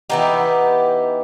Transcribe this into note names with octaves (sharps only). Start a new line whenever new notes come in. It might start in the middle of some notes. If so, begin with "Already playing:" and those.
E3 B3 D#4 G4